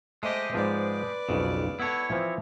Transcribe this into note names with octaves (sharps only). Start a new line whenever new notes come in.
G#3 A3 G4 C5 D#5
G#2 F3 C4 B4 D5
B1 F2 C#3
B3 E4 A4 C#5
E3 F3 C4